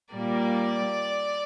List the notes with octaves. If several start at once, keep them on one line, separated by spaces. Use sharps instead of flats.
A#2 G3 A#3 D5